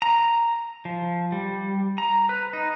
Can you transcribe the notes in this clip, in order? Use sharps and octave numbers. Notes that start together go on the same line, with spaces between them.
A#5
F3
G3
A#5
B4
D#4